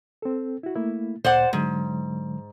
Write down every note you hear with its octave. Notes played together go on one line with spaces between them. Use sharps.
C4 A4
E4 F#4
A3 A#3 E4
D2 A#2 C5 D5 F#5
G#2 D3 F#3 G#3